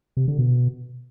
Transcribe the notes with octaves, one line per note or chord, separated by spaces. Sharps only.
C3
D3
B2